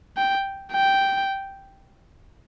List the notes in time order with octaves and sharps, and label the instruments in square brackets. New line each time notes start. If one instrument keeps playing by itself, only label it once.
[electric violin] G5
G5